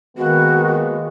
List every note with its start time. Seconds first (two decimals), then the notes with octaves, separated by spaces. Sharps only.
0.18 D#3 G#3 A#3 B3 F#4